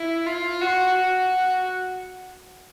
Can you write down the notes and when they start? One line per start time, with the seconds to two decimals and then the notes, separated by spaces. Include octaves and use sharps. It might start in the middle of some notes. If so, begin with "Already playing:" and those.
Already playing: E4
0.26 F4
0.61 F#4
0.96 F#4